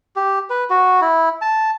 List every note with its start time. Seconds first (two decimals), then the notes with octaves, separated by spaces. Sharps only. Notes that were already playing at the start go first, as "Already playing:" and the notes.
0.16 G4
0.50 B4
0.70 F#4
1.02 E4
1.42 A5